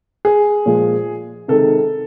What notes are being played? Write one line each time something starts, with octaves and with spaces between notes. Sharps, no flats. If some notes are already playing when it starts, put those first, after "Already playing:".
G#4
A#2 F3 G#3
C3 D#3 G#3 A4